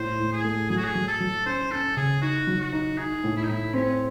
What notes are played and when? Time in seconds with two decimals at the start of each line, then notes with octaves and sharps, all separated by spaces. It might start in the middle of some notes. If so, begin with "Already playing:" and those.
Already playing: A2 C5
0.19 A2
0.32 G#4
0.45 A3
0.70 F#3 G#4
0.77 F#4
0.84 G#4
0.95 F#3
1.08 A4
1.20 F#3
1.46 C#4 C5
1.71 C#4 A4
1.97 C#3 G#4
2.22 D#4 F#4
2.47 F#3
2.61 F#4
2.73 D#4
2.98 D#4 G#4
3.24 A2
3.37 E4
3.43 D#4
3.49 A2 E4
3.74 C4 C#4